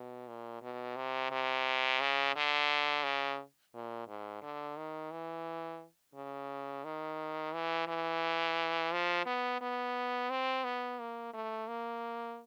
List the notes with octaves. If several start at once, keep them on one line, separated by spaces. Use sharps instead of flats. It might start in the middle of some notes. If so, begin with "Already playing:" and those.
Already playing: B2
A#2
B2
C3
C3
C#3
D3
C#3
A#2
G#2
D3
D#3
E3
C#3
D#3
E3
E3
F3
B3
B3
C4
B3
A#3
A3
A#3